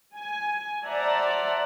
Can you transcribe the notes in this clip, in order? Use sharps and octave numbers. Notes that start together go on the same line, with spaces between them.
G#5
C5 D5 E5 F#5 A5 A#5